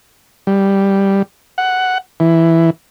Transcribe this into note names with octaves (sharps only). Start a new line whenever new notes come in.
G3
F#5
E3